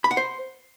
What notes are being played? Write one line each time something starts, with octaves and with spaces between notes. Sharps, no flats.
B5
F#5
C5